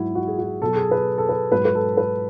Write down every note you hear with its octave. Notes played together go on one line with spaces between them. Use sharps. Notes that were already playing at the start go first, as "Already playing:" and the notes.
Already playing: G#2 F#3 E4 F#4
F#4
G#4
F#4
B2 F#3 A4
G#4
B4
A4
B4
G#2 F#3 B4
B4
A4
B4